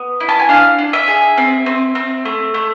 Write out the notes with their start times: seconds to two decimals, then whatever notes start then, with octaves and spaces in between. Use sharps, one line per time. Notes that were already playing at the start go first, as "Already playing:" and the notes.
Already playing: B3
0.20 E4
0.29 A5
0.39 G#5
0.49 D4 F5
0.78 D4
0.93 E5
1.08 G#4
1.38 C4
1.66 C4
1.95 C4
2.25 A3
2.54 A3